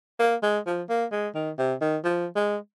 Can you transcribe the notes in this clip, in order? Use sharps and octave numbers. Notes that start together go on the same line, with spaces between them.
A#3
G#3
F3
A#3
G#3
D#3
C3
D#3
F3
G#3